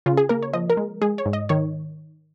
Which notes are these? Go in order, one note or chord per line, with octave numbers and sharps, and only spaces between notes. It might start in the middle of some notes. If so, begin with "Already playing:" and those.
C#3 F4
G#4
A#3 A#4
C#5
F3 D#5
A#4
G#3
G#3 G#4
C#5
G#2
D#5
D#3 C#5